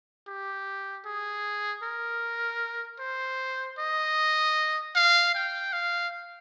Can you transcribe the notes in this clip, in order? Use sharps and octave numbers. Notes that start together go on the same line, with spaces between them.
G4
G#4
A#4
C5
D#5
F5
G5
F5